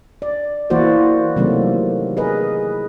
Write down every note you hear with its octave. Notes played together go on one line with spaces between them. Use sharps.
D5
E3 A#3 E4 F#4 C5 D5
C3 D#3 F#3 A3 A#3
G#4 A#4 B4 D#5